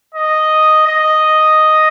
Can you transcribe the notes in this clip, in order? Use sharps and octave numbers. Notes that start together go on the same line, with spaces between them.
D#5
D#5